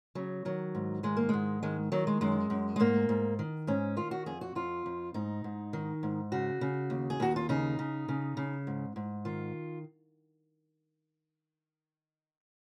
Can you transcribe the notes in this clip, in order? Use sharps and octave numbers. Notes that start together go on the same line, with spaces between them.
C#3 F#3
D#3 F#3
G#2
D#3 G#3
A#3
G#2 G#3
D#3 G#3
D#3 F#3
G#3
F#2 G#3
F#2
G#3
G#2 A#3
G#2
D#3
G#2 C#4
D#3 F4
F#4
F2 G#4
F#4
F2 F4
F2
G#2 D#4
G#2
D#3
G#2
C#3 F#4
C#3
D#2
G#4
D#2 F#4
F4
C#3 D#4
C#3
C#3
C#3
G#2
G#2
D#3 F4